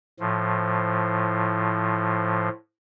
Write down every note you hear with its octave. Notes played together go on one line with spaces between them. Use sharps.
A2 F3